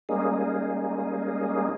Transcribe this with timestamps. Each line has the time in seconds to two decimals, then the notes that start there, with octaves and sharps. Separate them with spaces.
0.09 G3 G#3 A#3 C#4 D#4 G#4